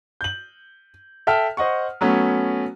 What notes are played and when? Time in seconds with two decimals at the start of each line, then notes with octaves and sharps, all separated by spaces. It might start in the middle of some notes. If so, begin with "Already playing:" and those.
0.21 G6 F#7
1.27 A4 E5 G5 A5 F6
1.57 C5 D#5 F#5 C#6
2.01 F#3 A3 B3 C#4